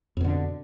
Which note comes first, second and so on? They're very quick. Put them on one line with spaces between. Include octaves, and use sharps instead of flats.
F2 B2 D3